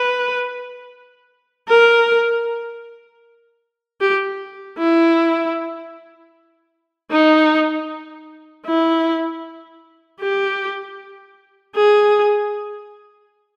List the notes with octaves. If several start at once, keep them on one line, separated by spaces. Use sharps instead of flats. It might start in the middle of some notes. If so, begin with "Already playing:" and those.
Already playing: B4
A#4
G4
E4
D#4
E4
G4
G#4